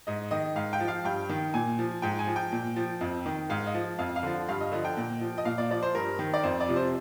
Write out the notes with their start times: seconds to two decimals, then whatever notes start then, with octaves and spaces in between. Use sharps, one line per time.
0.07 G#2 D#5
0.31 D#3 D#5
0.56 G#2 F5
0.73 G5
0.80 F3
0.88 F5
1.05 G2 G5
1.29 D#3
1.54 A#2 G#5
1.79 F3
2.02 G#2 G5
2.19 G#5
2.27 F3
2.36 G5
2.52 A#2
2.76 F3
3.01 F2
3.26 D#3
3.50 G#2 F5
3.67 D#5
3.74 F3
3.99 F2 F5
4.16 F5
4.23 D3 F3
4.49 G2 F5
4.61 D#5
4.72 D3 F3 D#5
4.85 G5
4.97 A#2
5.21 F3
5.38 D#5
5.45 A#2 F5
5.58 D5
5.70 F3 D5
5.83 C5
5.95 G2 A#4
6.19 D#3
6.34 D5
6.44 F2 C5
6.60 D5
6.69 C3 F3
6.76 C5